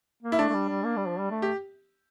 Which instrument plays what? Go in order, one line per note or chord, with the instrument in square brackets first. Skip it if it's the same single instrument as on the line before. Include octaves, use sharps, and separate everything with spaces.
[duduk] A#3
[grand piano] E4
[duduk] A3 [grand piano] D4
[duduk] A3
G3
G3
A#3
G3
F3
G3
A3
[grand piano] G4